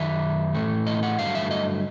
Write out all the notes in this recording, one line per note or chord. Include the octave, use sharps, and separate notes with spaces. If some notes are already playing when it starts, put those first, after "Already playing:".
Already playing: F#2 D#3 E5
A2 E3 A3
D#5
F#5
G2 D3 F#3 A3 F5
E5
D#5